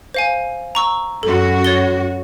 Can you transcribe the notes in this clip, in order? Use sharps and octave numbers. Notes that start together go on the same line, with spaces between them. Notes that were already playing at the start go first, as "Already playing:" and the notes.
C5 F5 G#5
A#5 C#6 E6
F#2 F#4 A4
C#5 A6 G7